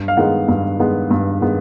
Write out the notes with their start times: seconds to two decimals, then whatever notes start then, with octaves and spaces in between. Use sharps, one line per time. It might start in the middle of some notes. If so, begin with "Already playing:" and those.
Already playing: G2
0.08 F5
0.17 D#3 G#3 B3 F#5
0.48 G2
0.79 D#3 G#3 B3
1.11 G2
1.41 D#3 G#3 B3